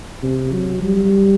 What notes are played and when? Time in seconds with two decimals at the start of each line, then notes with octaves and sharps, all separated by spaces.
0.23 C3
0.53 F#3
0.83 G3